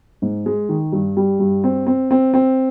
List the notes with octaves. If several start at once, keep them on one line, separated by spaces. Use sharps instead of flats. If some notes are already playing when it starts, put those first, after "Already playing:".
G#2
G#3
D#3
G2
G3
G2
C4
C4
C4
C4